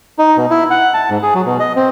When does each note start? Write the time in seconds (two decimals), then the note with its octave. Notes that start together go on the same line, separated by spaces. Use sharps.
0.19 D#4
0.37 B2
0.50 E4
0.70 F#5
0.94 A5
1.10 G#2
1.23 G#4
1.34 F#3
1.46 B2
1.60 D#5
1.76 C4